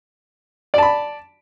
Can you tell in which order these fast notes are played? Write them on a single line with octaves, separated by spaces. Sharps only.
D5 A5 B5